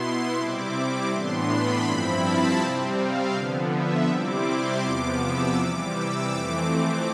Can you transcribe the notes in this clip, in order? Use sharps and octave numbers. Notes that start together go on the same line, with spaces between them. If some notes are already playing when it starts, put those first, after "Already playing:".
Already playing: B2 B3 E4 C6
C3 G3 C4 E4 D6
A2 E3 B3 D4 C6
B5
G2 F3 C4 E4
A5
C3 G3 C4
F5
D3 F3 B3
E5
C3 G3 C4 E4 D6
C6
E2 C3 F3 B3 D6
E6
C3 E3 G3 D6
E6
F2 E3 A3 C4 D6
D6